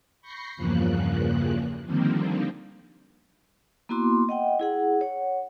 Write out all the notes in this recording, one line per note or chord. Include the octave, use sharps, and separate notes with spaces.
B5 C#6 G6 A#6 C7 C#7
E2 G2 C#3 F3 A#3 F#6
D3 D#3 F3 G3 A#3 C4
A#3 B3 E4 F#4 C6 D6
D#5 F#5 G5
E4 G#4 F#5
C#5 F#5